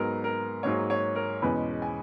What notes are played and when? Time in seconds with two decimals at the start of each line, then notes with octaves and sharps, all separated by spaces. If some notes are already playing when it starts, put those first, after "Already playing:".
Already playing: G#2 F#3 B3 A#4
0.24 A#4
0.63 G#2 F#3 A#3 C#5
0.90 C#5
1.15 A#4
1.42 E2 B2 G#3 C#4 B4
1.82 G#5